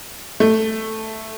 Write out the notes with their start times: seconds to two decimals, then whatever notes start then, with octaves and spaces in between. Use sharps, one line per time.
0.40 A3